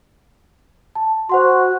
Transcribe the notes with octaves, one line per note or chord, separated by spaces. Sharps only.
A5
F#4 C5 F#5 C6